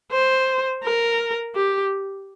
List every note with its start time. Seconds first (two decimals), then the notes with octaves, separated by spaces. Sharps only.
0.12 C5
0.84 A#4
1.55 G4